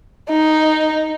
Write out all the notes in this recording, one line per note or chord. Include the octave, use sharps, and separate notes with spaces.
D#4